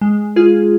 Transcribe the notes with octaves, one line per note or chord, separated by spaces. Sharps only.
G#3
F4 G#4